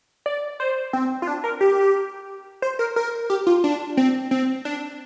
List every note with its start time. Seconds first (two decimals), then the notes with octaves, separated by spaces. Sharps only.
0.26 D5
0.60 C5
0.93 C4
1.22 F4
1.27 D4
1.44 A#4
1.61 G4
2.62 C5
2.79 A#4
2.96 A#4
3.30 G4
3.47 F4
3.64 D4
3.97 C4
4.31 C4
4.65 D4